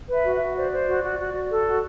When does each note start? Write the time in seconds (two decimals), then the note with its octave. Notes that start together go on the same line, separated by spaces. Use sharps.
0.09 B4 E5
0.25 F#4
0.35 E5
0.41 F#4
0.56 C5 D5
0.72 C5
0.88 F#4
1.03 F#4
1.19 F#4
1.34 F#4
1.50 A4
1.66 F#4